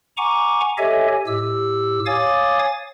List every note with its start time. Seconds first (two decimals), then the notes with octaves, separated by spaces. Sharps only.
0.17 F#5 G#5 A#5 C#6 D6
0.78 G4 A4 C#5 D#5 E5 G#5
1.27 A2 G4 E6
2.06 C#5 F5 G#5 D6 D#6 A6